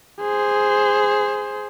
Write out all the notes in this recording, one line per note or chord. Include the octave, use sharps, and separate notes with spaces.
G#4 C5